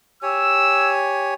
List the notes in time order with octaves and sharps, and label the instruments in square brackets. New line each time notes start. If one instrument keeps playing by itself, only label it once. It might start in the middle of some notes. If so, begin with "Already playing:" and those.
[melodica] G4 C#5 G#5 [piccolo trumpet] E6